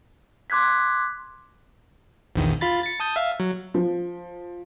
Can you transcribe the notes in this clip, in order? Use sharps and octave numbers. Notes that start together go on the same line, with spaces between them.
C6 D6 F#6 G#6 B6
A#1 E2 D#3
F4 B5 A6
A6 C#7
A5 D#6 G6
E5 F5
F#3
F3